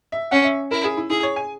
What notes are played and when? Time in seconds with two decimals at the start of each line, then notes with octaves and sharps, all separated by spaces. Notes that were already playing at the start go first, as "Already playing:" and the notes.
0.12 E5
0.31 C#4 F#5
0.44 E5
0.71 E4 A#4
0.84 G#4
0.97 E4
1.10 E4 G#4
1.23 C#5
1.36 G#5